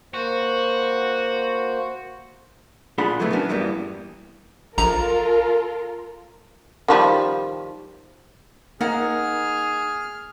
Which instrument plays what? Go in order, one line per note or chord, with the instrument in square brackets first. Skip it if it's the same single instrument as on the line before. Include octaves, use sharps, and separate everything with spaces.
[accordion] A#3 C5 [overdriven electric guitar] F#4
[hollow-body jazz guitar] A#2 D4 F4 G#4 F#5 B5
B2 E3 F#3 A3 B3
B3 C#4 D4 F#4 A#4
E2 G2 E3 G3 A#3 B3
[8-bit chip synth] A#1 A#5 [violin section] F4 A4 A#4
[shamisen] D#3 F3 G3
[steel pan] A#3 [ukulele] D#4 F#5 [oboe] G#4 [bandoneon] F6